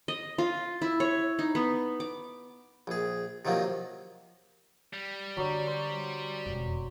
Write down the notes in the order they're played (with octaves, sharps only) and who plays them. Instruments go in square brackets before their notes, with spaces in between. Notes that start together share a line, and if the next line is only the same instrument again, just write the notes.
[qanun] D#5
F4
E4
C#5
D#4
B3
D6
[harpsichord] A#1 G#4
C3 D#3 F3 F#3 A#3
[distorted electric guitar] G3
[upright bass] D3 [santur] F#3 D5
[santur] C5
[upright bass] E1 F2